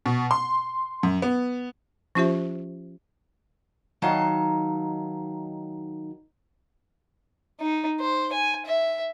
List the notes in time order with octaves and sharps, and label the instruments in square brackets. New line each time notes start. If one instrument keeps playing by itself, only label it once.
[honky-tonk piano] B2
C6
F#2
B3
[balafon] F3 C#4 F4 G4 C5 E5
[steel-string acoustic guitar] D#3 F#3 D#4 F5 A5
[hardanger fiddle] D#4
C5
G#5
E5